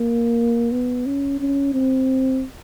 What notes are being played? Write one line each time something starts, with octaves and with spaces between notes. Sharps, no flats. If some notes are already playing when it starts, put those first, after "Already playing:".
Already playing: A#3
B3
C#4
C#4
C4